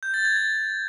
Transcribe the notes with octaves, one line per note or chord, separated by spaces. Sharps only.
G6
A6
G#6
A6